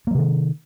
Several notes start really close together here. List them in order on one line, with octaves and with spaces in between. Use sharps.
A#3 F#3 C3 D#3